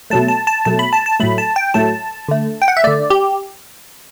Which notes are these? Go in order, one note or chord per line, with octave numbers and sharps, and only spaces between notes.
B2 F#3 A3 A5
A5
A5
B2 F#3 A3 A5
B5
A5
A5
A2 F#3 A3 B5
A5
G5
A2 F#3 A3 A5
D3 A3
G5
F#5
E5
D3 A3 D5
G4